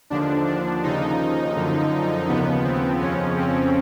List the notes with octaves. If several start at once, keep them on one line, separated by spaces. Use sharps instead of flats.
D#2 D3 F3 D4
D4
D#2 C#3 F3 D#4
F#2 D3 F3
D#2 C#3 F3 B3
C4
F2 C#3 F3 C#4
C4